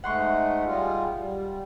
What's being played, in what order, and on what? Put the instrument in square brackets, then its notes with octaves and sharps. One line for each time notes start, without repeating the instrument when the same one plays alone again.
[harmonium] G#2 G#3 A3 [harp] F#5 C6 C#6
[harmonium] G3 G#3 F4
G3